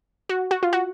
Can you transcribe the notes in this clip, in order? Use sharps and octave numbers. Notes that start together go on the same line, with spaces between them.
F#4
F#4
F4
F#4